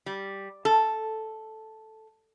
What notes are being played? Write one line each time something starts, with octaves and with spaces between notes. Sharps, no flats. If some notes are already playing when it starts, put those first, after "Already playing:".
G3
A4